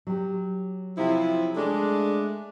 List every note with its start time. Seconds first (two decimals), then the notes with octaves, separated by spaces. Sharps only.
0.07 F#3 G4
0.97 C3 F3 E4
1.56 G#3 A3 D4